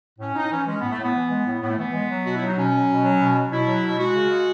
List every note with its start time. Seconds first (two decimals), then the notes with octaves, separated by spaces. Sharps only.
0.19 A2 C#4
0.35 A2 D#4
0.51 E3 C#4
0.66 G#3 C#4
0.79 A2 B3
0.91 A3
0.99 A2 B3
1.14 E3
1.30 G#3
1.46 A2
1.61 A2 B3
1.69 A3
1.78 E3 B3
1.93 G#3
2.09 F#3
2.24 B2 F#4
2.34 E4
2.41 F#3 D#4
2.57 B2 C#4
2.72 F#3
2.88 B2
3.03 F#3
3.19 B2
3.36 F#3
3.51 B2 E4
3.66 F#3
3.82 B2
3.97 G#3 F#4
4.14 C#3
4.29 G#3